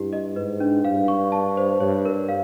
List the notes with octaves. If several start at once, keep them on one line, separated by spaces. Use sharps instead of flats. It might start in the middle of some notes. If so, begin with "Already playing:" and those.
Already playing: G2 E4 G4
D#5
G#2 B4
D4
G2 F5
C#6
A5
C5
G2 C#5
A#4
F5